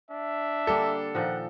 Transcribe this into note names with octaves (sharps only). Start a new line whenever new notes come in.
D4 E5
D3 G3 A#3 A4
A#2 D#3 F3 F#5